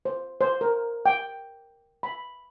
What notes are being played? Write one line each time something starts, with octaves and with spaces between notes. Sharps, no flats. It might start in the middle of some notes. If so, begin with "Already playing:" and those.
C5
C5
A#4
G5
B5